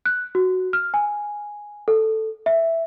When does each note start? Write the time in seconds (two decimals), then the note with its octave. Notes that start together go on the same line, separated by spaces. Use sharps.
0.06 F#6
0.35 F#4
0.73 F6
0.94 G#5
1.88 A4
2.46 E5